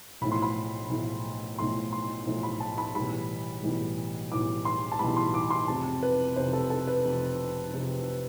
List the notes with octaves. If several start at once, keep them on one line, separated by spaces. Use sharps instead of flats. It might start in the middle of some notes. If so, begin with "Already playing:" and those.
B1 A2 F3 A3 B5
C6
B5
B1 A2 F3 A3
B1 A2 F3 A3 C6
C6
B1 A2 F3 A3
B5
A5
B5
B1 A2 E3 G3 B5
B1 A2 E3 G3
B1 A2 E3 G3 D6
C6
A5
B1 A2 E3 G3 B5
C6
D6
C6
F1 F2 C3 A5
B4
F1 F2 C3 C5
A4
A4
B4
F1 F2 C3
F1 F2 C3